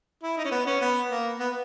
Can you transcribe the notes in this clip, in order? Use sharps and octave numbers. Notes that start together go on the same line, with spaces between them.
E4
D#4
C#4
B3
C#4
B3
A#3
B3